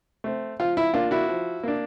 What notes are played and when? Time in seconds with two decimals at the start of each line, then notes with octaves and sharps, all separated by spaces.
0.24 A3 C4
0.60 F3 F4
0.77 E4
0.94 A#3 D4 F4
1.11 E4 F#4
1.29 F3
1.63 A#3 D4